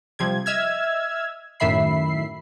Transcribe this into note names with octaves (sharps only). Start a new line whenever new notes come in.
C3 F3 G3 G#6
D#5 E5 E6 F6 G#6
F#2 A2 D#3 E5 B5 C7